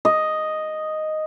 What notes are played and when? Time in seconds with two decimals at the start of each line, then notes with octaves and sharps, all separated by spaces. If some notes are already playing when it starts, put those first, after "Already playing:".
0.05 D#5